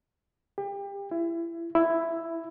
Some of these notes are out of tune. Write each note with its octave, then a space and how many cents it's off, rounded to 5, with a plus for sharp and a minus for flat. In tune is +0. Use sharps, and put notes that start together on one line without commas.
G4 +30
E4 +25
E4 +5